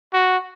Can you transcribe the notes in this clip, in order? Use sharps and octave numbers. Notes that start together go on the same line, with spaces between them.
F#4